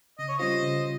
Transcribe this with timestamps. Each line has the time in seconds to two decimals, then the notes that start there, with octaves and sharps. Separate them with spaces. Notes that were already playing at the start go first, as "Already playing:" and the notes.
0.19 C#3 D#5
0.28 C#5
0.38 G3 C#4 F4 C5 D#5
0.63 C#3